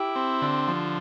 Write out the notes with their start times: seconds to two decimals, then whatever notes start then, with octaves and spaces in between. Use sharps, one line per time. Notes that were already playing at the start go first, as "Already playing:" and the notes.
Already playing: E4 G4
0.16 C4
0.42 D3
0.68 F3